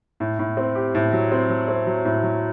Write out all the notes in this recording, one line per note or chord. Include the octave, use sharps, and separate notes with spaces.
A2
A2
C4
G4
A2
F#3
C4
F#3
C4
F#3
A2
F#3